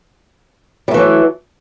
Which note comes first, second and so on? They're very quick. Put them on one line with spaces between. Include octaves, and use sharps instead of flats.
G3 A3 E3 F#3